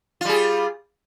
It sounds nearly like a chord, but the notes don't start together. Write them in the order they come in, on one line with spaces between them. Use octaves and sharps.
F4 G3 G#4